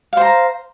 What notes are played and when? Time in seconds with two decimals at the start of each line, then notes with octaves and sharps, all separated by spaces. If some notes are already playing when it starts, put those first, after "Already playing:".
0.13 F5
0.17 C5
0.21 A#5